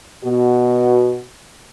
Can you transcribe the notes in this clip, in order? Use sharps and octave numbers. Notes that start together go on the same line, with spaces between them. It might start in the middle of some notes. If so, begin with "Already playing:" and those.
B2 F#4